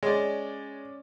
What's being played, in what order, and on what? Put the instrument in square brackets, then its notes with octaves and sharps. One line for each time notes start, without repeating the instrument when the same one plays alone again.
[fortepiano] G#3 [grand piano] C#4 D5